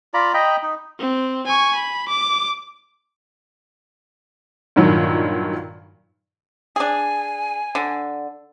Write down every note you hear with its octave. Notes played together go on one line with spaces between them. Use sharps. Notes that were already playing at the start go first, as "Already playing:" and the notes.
F4 D5 A#5 B5
D#5 G5 A#5 B5
D#4
C4
G#5 C#6
B5
D6
G2 A#2 D#3 F#3
D4 G#4 G#5
D3